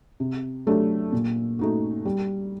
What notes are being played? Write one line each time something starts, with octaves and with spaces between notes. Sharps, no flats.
C3
F#3 A3 D4 G4
A#2
A3 D#4 F#4
G3